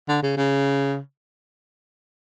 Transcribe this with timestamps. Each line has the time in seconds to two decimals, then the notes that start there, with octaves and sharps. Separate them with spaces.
0.08 D3
0.23 C#3
0.37 C#3